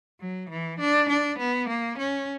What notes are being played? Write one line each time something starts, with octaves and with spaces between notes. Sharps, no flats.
F#3
E3
D4
D4
B3
A#3
C#4